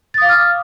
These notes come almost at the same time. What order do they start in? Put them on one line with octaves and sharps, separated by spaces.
A6 D#6 F5 D6 F6